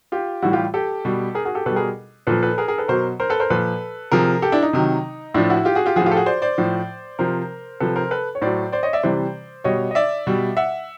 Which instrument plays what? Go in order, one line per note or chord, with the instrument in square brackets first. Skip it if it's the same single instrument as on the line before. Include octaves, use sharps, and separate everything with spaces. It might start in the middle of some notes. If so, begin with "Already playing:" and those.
[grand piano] F4 G4
A2 E3 G3 E4 F#4
F4 G4
G4 A4
B2 G3
G#4 A#4
F#4 G#4
G4 A4
B2 G3 A4 B4
G#4 A#4
A#2 F3 A4 B4
A4 B4
G#4 A#4
G#4 A#4
A4 B4
B2 F#3 A#4 C5
A#4 C5
A4 B4
A#4 C5
A#2 F3 A4 B4
C3 F3 G#4 A#4
G4 A4
D4 E4
D#4
C3 D#3 F#3
A2 F3 D4 E4
E4 F#4
F4 G4
F#4 G#4
F4 G4
A2 F3 F#4 G#4
F4 G4
A4
F#4 G#4
C5 D5
C5 D5
A2 F3
C3 F3 A#4 C5
C3 F3 A4 B4
A#4 C5
A4 B4
C#5
A2 F#3 C5 D5
C5 D5
C#5 D#5
D5 E5
C3 E3 G3 C5 D5
B2 G3 C#5 D#5
D#5
D5 E5
B2 G3
E5 F#5